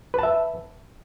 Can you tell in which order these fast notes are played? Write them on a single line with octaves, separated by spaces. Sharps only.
B4 A5 E5